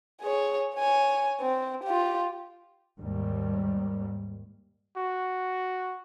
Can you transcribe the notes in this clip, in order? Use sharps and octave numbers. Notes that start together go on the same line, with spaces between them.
G#4 C#5
C#5 G#5
C4
F4 G4
D#2 G#2 G3
F#4